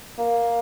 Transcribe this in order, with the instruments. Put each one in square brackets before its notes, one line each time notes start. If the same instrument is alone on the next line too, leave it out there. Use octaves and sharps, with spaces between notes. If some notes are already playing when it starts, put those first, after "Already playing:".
[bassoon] A#3